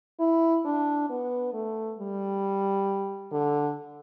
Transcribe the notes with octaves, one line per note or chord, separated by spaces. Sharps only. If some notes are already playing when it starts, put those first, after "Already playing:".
E4
D4
B3
A3
G3
D3